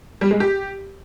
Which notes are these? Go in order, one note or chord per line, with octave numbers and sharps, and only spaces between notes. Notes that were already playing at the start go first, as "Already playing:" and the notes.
G3
G#3
G4